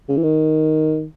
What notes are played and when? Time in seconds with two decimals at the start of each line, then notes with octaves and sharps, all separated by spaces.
0.09 C#3
0.17 E3
0.23 D#3